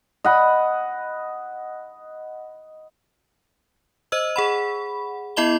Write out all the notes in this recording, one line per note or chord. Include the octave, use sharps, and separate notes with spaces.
D#5 F#5 B5
C5 D#5 E6
G#4 F#5 B5
B3 E4 D#5 B5 G7